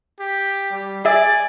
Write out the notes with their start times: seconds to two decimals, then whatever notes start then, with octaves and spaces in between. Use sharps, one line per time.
0.20 G4
0.71 G3
1.05 G#4 D5 E5 G#5